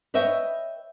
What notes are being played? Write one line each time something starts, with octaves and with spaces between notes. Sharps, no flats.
B4 C#5 D#5 E5 G5